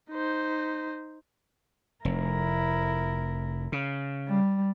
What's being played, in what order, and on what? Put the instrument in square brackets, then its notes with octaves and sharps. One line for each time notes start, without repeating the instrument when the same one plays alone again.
[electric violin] D#4 C5
[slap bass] F1 [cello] E4 A#4
[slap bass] C#3
[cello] G3